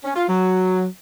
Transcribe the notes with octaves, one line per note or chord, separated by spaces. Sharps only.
C#4
F4
F#3